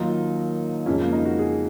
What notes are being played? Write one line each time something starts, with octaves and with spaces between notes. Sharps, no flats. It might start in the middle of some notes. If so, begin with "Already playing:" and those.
Already playing: D#2 D#3 F#3 A#3 D#4 F4
F2 C#3 G#3 C#4
A#3
D#4
F#4
G#4